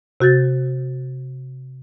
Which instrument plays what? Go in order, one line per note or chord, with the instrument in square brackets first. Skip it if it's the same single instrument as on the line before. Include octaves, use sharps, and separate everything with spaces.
[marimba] C3 F#4 G6 A6